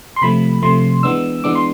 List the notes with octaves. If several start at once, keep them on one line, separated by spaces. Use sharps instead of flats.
C6
C3 F3 A3 B5
C3 F3 A3 C6
E3 G#3 B3 D4 E6
E3 G#3 B3 D4 D6
C6